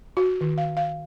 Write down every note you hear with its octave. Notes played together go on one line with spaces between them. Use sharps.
F#4
D#3
F5
F5